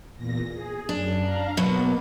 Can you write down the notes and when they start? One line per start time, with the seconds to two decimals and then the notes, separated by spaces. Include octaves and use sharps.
0.16 E2 A#2 A#6
0.52 G#4
0.89 F#2 D4
1.22 F5 A#5
1.57 B2 F#3 A#3 B3